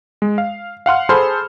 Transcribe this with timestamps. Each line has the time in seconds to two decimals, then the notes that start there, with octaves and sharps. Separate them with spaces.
0.22 G#3
0.38 F5
0.86 F5 F#5 C6 F6
1.09 G#4 A4 C5 B5 C6 F6